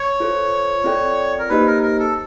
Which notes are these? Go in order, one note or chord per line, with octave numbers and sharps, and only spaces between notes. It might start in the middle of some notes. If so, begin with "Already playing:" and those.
Already playing: C#5
F4 A4 C5
C4 F4 A4 D5 G5
A#4
A#3 D#4 G4 B4 C5 D#5
A#4
A#4
A4